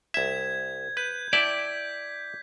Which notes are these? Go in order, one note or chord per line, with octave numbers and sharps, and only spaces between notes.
C2 E5 G#6
B4 G6
E4 D5 G5 A5 B6